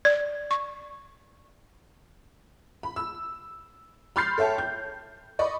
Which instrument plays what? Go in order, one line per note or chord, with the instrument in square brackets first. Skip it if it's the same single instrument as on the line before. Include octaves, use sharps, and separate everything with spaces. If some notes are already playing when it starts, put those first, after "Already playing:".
[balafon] D5
C#6
[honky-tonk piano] B5
E6
B5 C6 F6 G6 A6 C7
A4 C#5 E5 G5 A5
G6
D5 D#5 B5 C#6